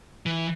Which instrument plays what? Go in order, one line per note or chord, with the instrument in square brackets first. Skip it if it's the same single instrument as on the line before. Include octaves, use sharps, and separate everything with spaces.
[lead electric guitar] E3